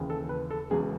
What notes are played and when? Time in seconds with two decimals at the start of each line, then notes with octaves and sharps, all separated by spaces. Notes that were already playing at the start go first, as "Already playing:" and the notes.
Already playing: D#2 C#3 E3
0.10 A4
0.29 B4
0.50 A4
0.70 E1 E2 C#3 G#3 G#4